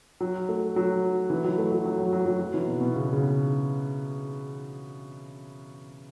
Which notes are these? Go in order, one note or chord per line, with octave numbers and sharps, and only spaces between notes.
F#3
A3
F#3
E3
F#3
A3
F#3
F#3
F#3
F#3
F#3
F#3
E3
B2
B2
C#3
C#3